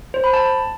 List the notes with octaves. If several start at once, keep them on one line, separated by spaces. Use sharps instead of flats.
C5
B5
A5